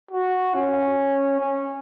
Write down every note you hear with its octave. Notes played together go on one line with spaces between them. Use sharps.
F#4
C#4
C#4